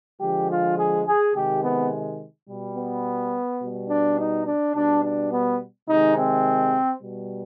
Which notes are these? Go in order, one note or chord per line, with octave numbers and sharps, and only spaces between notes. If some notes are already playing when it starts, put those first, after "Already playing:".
D3 F3 G#3 G4
F4
G#4
G#4
C3 D#3 G#3 G4
B3
B2 G3
B3
B2 G3
D4
D#4
D4
B2 G3 D4
D4
B3
C3 D#3 G#3 D#4
C4
B2 G3